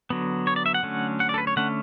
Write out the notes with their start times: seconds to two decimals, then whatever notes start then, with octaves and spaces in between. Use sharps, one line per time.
0.10 D3 F#3 B3
0.47 C#5
0.56 D5
0.66 E5
0.74 F#5
0.83 D3 F#3 A3 C#4
1.20 F#5
1.29 D5
1.34 A4
1.38 B4
1.47 C#5
1.56 D3 A3 C#4 F#5